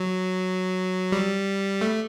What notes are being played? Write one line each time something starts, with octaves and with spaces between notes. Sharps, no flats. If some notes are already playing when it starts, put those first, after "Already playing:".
Already playing: F#3
G3
A3